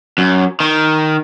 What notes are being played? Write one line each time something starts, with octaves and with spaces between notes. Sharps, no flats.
F#2
D#3